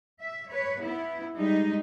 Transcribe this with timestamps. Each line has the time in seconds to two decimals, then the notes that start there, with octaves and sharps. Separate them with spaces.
0.18 E5
0.50 B4 C#5
0.81 B3 E4
1.35 G3 G#3 D#4